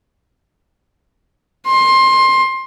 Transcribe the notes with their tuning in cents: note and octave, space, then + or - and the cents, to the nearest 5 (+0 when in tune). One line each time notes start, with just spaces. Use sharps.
C6 +20